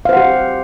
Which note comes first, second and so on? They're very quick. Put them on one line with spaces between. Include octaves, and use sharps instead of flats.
F5 C5 F#5 G4